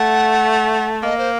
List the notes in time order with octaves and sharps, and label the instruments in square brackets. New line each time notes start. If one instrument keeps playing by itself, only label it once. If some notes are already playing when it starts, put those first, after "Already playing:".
Already playing: [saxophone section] A3 [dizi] F#5
[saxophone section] A#3 [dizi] D#5
[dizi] C5